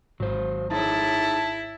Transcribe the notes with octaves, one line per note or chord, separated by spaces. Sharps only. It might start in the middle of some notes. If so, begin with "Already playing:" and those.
G#1 F#3 C5
D#4 E4 G#4 C#5 A5